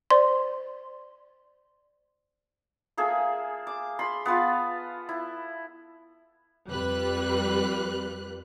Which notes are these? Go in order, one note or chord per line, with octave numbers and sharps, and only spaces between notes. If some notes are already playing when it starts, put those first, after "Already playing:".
C5 D5 C6
A#3 G#4 A4 E5
D6
B5 C6
B3 F4 B4 A5
E4
F2 G3 B4 F#6